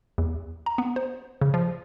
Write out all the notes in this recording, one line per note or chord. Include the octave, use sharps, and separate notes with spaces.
E2
A#5
B3
C5
C#3
F3